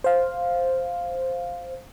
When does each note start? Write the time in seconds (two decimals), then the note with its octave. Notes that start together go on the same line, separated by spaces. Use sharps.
0.04 C5 F5